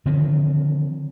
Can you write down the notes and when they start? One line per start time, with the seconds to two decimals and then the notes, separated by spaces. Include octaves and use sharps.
0.06 D3 D#3 F3 C4